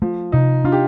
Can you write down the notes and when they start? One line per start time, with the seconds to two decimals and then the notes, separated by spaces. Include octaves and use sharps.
0.02 F3 A3
0.32 C3 D#4
0.64 D4 F4
0.72 G4